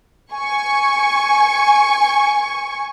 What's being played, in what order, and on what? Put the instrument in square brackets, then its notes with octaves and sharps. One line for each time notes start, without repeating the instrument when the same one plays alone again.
[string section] G#5 C#6